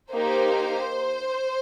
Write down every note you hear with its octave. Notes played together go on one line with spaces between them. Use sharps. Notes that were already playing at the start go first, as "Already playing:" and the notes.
A#3 D#4 G4 C5